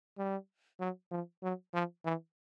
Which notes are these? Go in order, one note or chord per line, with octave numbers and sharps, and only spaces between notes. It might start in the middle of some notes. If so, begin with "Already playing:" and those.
G3
F#3
F3
F#3
F3
E3